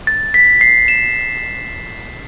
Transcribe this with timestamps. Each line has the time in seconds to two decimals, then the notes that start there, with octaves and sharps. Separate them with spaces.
0.07 A6
0.34 B6
0.61 C7
0.88 E7